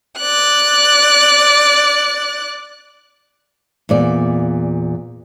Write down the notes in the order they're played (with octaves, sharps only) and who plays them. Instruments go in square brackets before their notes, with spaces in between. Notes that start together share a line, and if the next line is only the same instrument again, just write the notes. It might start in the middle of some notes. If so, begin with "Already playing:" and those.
[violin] D5 F#6
[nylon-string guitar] E2 A#2 D5